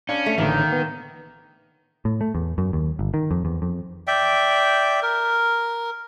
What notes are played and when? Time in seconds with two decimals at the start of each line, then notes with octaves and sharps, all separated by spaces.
0.09 C#4 D4 F5
0.26 A3
0.38 A1 D3 D#3 A#3
0.72 B3
2.05 A2
2.21 A3
2.35 E2
2.58 F#2
2.73 D#2
2.99 G1
3.14 D#3
3.31 F2
3.45 E2
3.62 F2
4.07 D5 E5 G5
5.03 A#4